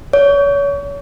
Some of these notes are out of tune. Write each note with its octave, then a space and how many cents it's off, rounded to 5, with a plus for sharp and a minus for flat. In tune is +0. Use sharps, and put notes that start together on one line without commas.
C#5 +35